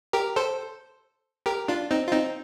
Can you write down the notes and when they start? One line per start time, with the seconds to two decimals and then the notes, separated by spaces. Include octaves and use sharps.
0.13 G4 A#4
0.36 A4 C5
1.46 G4 A#4
1.68 D4 F4
1.91 C4 D#4
2.07 F4
2.12 C4 D#4